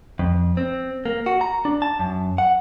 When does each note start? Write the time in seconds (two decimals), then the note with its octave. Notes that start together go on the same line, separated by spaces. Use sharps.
0.19 F2
0.57 C4
1.06 A#3
1.26 F#4
1.41 A#5
1.65 D4
1.82 A5
1.99 F#2
2.38 F#5